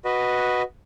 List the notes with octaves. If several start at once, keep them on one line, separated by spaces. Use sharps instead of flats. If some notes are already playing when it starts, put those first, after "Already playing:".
F#4 B4 D#5